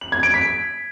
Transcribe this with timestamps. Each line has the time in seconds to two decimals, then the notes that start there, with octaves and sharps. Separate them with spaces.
0.01 F#7
0.12 G#6
0.23 D7
0.34 B6